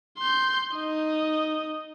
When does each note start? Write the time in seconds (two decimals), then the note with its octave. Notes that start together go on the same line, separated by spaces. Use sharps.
0.18 C6 G6
0.76 D#4 D#5